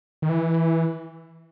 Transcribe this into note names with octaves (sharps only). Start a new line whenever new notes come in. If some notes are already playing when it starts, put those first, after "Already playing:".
D#3
E3